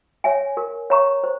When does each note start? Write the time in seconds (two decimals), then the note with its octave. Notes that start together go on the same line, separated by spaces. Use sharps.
0.24 C#5 E5 G#5
0.57 A#4
0.90 C#5 E5 A#5 C#6
1.24 C5